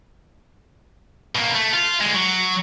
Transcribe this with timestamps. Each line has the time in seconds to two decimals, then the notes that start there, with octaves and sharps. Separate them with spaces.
1.35 B2 A#3
1.55 A3
1.74 F4
2.01 D3 G#3
2.15 F#3